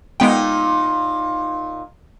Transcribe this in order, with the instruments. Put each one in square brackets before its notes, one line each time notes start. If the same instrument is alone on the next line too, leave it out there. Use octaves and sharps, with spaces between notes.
[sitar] A#2 D#4 [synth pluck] G#3 B3 G5